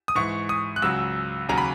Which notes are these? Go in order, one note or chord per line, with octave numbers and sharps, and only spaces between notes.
D#6
G#2 E3 C#6
D#6
F#6
C#2 C#3 F#3 E6
D#2 C#3 F#3 A#5
B5